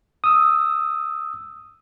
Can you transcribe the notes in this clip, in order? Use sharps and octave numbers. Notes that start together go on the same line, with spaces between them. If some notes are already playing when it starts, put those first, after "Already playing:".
D#6 E6